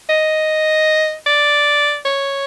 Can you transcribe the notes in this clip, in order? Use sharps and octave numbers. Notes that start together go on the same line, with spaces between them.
D#5
D5
C#5